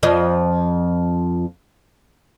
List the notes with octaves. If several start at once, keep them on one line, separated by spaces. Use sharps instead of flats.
F2 F3 D#5